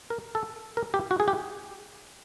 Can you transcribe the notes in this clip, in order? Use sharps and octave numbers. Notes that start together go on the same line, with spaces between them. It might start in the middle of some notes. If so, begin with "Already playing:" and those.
A#4
A4
A#4
G4
F#4
G#4
G4